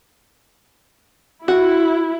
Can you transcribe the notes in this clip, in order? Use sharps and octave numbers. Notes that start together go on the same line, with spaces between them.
E4 F#4